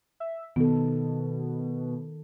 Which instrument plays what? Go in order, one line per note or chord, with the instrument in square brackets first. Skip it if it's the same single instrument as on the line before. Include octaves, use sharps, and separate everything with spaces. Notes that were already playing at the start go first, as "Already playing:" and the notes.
[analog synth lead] E5
[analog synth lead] B2 [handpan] D#3 A4 [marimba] B3